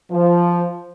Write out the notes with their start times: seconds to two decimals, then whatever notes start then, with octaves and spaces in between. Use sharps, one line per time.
0.11 F3